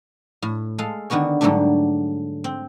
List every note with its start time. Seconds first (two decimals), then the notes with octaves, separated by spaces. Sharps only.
0.42 A2
0.78 G#3 A4 F5
1.10 D3 D#3 B3 F#4 C#5
1.41 G#2 D3 F#3 G3 A3 D4
2.44 C4